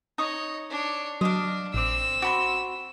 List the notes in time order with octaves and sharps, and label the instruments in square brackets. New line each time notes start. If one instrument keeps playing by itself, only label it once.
[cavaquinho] D#4 C#6 D#6 [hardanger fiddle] C#5 D#5
[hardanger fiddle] D4 C#5
[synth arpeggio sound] F#3 [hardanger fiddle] D4 [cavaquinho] D#5 F5
[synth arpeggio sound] A1 D6 [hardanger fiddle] C4 [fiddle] E6
[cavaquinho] F#4 B5 C6 [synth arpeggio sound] D6